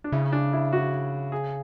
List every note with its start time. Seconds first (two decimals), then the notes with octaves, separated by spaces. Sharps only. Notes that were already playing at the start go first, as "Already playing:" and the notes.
0.04 D4
0.12 C#3 E4
0.32 D4
0.53 E4
0.73 F#4
1.32 G#4